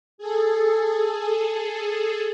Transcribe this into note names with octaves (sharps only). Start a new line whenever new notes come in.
G#4 A4